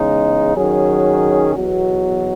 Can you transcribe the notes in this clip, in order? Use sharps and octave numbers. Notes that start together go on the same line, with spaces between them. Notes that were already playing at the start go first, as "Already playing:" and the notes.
Already playing: E2 C#3 G#3 D#4
D#3 F#3 C#4 G#4
E2 B2 F#3